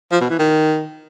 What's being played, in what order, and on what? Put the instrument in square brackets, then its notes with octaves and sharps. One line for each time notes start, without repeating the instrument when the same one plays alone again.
[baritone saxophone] F3
B2
E3
D#3